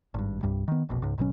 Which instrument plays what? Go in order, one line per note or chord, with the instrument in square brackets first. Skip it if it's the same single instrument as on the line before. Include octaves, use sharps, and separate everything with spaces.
[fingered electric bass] G#1 G2
C2 G2 G3
D#3 B3
F1 A#1 B2
C#2 G#2
G#1 B2 F#3 C#4